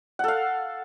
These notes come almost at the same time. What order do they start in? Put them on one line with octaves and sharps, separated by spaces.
F#5 A4 F5